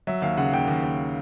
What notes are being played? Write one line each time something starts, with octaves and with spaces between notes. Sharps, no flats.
F#3 E5
D#2 F5
C#3 F#5
D#2 G5
D#2
D#2